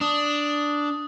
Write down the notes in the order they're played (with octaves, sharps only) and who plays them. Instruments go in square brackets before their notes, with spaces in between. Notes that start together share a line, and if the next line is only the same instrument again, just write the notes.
[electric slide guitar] D4 [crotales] D#6